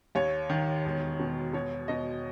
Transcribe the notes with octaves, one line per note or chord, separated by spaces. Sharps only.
D#2 C#5
D#3
E1
B2
B2 C#5
B2 D#5